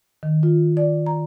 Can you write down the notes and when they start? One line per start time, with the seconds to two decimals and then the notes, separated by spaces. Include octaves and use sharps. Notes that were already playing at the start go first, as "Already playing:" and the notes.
0.23 D#3
0.43 F4
0.77 D5
1.06 A#5